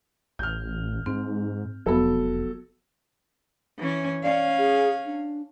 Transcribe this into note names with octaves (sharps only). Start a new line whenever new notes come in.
A1 F6 G6
G#2 C4
F1 F3 F#3 B3 A4
E3 C#4
C#4 D5 F5
G#4
D4